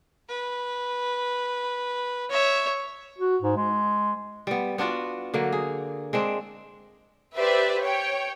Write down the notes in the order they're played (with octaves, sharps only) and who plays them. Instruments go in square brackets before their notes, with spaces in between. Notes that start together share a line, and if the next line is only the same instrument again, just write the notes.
[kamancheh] B4
[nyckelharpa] C#5 [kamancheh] E5
[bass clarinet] F#4
G#2
G#3
[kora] G3 B3
B3 D4 F4 F#4
D3 F#3 A#3
G#4
G#3 C4 D4
[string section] G4 B4 C5 D5 E5
C#5 G5